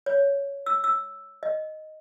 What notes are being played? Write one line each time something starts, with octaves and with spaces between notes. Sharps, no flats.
C#5
E6
E6
D#5